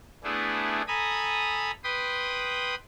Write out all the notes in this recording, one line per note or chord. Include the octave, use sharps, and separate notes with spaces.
A3 B3 D4 E4 G#4
A4 G#5 A#5 B5 D#6
B4 G5 B5 C6 D#6